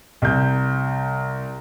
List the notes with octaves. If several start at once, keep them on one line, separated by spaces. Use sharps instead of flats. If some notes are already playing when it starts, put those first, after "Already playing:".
C2 G6